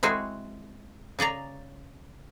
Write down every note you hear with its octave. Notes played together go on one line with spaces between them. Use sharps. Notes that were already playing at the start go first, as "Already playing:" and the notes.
G#3 C4 E4 F#4 G#4
C#3 G#4 D5 A#5